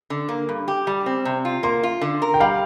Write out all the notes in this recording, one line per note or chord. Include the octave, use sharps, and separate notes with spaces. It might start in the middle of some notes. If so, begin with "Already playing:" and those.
D3
A#3
G2
G4
G3
C4
C3
F4
A#3 C6
F4
D3
A#4
G5
G3 F5